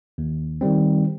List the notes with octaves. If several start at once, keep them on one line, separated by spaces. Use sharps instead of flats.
D#2
D#3 G3 C4